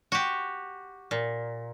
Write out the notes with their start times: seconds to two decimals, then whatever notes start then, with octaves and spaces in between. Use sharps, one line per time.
0.12 F#4 G4
1.11 A#2